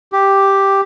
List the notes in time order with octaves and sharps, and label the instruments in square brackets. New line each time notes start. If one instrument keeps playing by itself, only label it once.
[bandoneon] G4